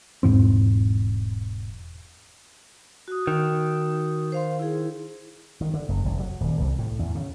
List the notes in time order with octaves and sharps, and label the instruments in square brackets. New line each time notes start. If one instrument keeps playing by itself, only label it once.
[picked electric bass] E1 G#2 E3 C4
[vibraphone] F#4 D#6
[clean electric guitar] D#3
[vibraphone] C5 F5 C6
E4 G#4
[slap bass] D#3
D3
F#1
F1
F#3
D#1
C2
A2
E2
C#3